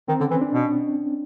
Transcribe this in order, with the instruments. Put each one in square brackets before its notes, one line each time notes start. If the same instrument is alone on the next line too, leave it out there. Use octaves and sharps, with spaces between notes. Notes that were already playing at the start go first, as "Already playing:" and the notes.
[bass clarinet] D#3 [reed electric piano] C4
[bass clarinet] D3 [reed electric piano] C#4
[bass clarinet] E3 [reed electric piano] C4
[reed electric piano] D4
[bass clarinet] B2